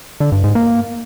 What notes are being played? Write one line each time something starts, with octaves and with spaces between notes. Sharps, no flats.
D3
G2
G#2
A#3